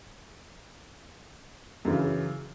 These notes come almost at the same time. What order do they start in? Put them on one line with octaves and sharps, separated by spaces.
F#2 E3 C#3